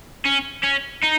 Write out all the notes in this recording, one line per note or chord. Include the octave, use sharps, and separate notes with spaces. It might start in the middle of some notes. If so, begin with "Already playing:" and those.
C#4
C#4
D#4